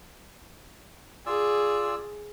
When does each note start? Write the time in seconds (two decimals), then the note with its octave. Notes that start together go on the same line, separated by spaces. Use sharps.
1.26 F4 G#4 D5 E6